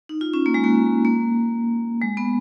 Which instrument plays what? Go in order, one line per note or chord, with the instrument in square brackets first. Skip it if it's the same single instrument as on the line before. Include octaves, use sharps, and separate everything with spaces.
[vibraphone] D#4
F4
C#4
A#3
G#3
A#3
A#3
G#3
B3